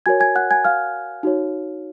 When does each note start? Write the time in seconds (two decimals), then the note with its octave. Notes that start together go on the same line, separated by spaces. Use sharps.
0.06 F#4 A#4 C#5 G#5 G#6
0.20 G#5 G#6
0.35 F#5 F#6
0.51 G#5 G#6
0.65 F5 F6
1.23 D#4 F#4 C#5